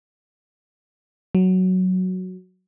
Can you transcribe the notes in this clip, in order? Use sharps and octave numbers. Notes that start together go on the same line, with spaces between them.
F#3